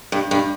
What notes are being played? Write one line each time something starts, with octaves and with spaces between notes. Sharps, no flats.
G2
G2